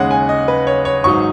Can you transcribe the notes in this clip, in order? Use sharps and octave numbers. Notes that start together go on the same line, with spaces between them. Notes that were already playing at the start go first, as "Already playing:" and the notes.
Already playing: D#2 C#3 G#3 C#4 F#5
G#5
D#5
B4
C#5
C#5
G#1 G#2 F#3 D#4 C#6